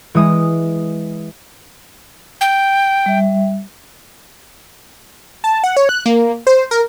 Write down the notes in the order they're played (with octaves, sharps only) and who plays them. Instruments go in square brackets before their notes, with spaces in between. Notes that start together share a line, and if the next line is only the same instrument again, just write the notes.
[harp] E3 G#3 D#6
[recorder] G5
[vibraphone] G3 E5
[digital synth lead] A5
F#5
C#5
F#6
A#3
C5
A#4